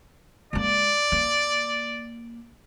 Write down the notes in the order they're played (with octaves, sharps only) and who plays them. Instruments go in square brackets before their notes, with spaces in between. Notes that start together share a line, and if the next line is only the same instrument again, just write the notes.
[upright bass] G#3 A#3 [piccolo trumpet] D5
[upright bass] A#3